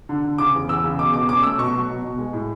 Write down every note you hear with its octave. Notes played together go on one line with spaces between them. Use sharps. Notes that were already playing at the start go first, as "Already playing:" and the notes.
D3
D3
C#3 D6
E2
E2 E6
C#3
B2 D6
B2 D6
C#4 D6
A3 E6
B2 C#6
F#3
B2
B2
G#3
A2